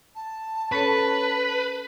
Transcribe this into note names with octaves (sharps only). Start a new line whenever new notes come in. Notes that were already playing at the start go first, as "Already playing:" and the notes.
A5
C#4 A4 B4 C#5